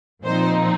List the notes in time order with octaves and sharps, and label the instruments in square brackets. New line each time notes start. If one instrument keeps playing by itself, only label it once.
[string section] A#2 F3 C4 D#4 C5